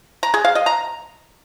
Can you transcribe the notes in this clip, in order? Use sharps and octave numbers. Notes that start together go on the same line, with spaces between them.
A#5
G#4
F5
D#5
A#5